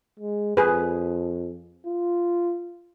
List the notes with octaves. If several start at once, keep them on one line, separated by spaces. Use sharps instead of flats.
G#3
F2 G#4 B4
F4